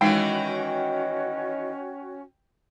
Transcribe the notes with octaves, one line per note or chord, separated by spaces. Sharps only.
D#3 E3 G#3 C#4 D#4 F#4 G5